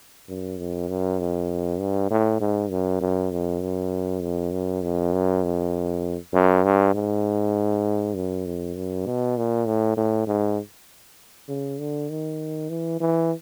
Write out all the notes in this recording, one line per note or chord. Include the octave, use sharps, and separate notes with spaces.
F#2
F2
F#2
F2
G2
A2
G#2
F#2
F#2
F2
F#2
F2
F#2
F2
F#2
F2
F#2
G2
G#2
F#2
F2
F#2
B2
A#2
A2
A2
G#2
C#3
D3
D#3
E3
E3